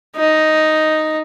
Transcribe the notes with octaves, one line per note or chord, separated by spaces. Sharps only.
D#4